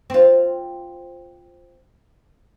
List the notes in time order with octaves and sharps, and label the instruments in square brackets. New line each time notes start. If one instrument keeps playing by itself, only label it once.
[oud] C4 F4